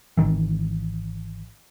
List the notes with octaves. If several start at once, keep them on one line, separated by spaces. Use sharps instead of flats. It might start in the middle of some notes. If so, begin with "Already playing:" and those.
G#1 E2 D#3 E3